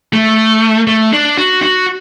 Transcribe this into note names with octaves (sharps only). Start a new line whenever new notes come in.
A3
A3
D4
F#4
F#4